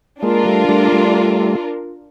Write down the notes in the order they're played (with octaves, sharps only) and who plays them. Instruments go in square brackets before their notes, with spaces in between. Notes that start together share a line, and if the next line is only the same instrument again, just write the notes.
[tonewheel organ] G#3 A#3 [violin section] D4 F4 A#4
[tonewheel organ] G3 A3
G3 A3
G3 A3